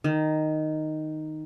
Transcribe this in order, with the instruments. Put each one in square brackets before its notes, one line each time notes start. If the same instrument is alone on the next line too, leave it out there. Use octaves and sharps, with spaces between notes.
[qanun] D#3